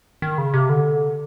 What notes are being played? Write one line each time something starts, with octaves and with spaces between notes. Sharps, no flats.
D#3
C#3
C3
D3